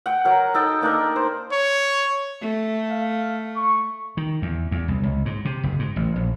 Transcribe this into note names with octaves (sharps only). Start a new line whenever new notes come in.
F#5 G5
F#3 A#4
D#4 A4 D#5 G5
A#3 D4 D#4 A#4
C5
C#5
A3
F5
C#6
D#3
E2
E2
C2
C#2
G#2
C3
F#1
G#2
A1
A#1